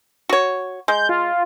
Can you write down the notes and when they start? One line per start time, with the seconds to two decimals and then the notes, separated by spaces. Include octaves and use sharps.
0.29 F#4 C#5
0.88 G#3 G6
1.09 F4